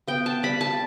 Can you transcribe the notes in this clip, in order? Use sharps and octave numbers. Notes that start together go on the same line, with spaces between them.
B3 G5
A5
G3 B5
A5